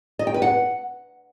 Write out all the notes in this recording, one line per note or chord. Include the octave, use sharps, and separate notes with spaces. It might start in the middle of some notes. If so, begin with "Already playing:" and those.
D#5
G5
B4
F#5